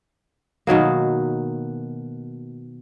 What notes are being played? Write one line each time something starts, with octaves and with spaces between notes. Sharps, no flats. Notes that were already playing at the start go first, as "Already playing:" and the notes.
B2 D#3 F#3 A#3